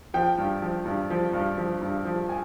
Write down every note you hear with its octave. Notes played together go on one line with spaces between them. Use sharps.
F3 G5
G2
F3
G2
F3
G2
F3
G2
F3
G#5